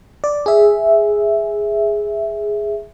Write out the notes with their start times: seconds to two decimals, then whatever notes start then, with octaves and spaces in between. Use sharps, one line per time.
0.24 D5
0.46 G#4 E5